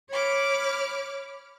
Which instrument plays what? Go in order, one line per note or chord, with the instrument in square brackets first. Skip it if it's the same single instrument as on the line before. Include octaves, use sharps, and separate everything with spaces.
[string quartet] C#5 B5 D6 F6